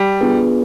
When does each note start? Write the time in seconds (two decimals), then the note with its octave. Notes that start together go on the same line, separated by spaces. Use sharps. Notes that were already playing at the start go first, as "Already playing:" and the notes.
Already playing: G3
0.21 B3 D4 F4 G#4 B4